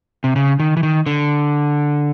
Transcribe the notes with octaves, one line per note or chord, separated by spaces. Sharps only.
C3
C#3
D#3
E3
D#3
D3